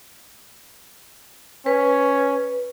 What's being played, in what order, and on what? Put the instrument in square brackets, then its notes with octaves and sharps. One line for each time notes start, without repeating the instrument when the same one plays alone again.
[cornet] C#4 [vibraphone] B4